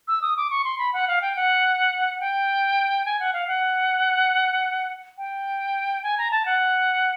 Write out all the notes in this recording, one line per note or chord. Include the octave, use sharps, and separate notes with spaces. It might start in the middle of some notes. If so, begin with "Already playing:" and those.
E6
D#6
D6
C#6
C6
B5
F#5
F5
G5
F#5
G5
G#5
F#5
F5
F#5
G5
G#5
A#5
A5
F#5